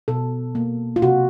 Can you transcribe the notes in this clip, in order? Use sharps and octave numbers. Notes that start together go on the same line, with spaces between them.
B2 A4
A#3
F4
C3 F#4